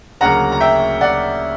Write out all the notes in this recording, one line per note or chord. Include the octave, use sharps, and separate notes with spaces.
D2 C#3 F#3 A#3 F#5 A#5
A#5
E5 G5
D5 F#5